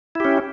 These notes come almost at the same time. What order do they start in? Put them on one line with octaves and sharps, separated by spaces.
E4 G4 C#4